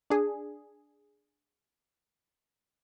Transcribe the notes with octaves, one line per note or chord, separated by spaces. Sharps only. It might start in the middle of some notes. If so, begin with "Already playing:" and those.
D4 G#4